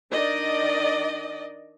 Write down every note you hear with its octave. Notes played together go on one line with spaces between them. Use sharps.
D#3 D4 D5 D#5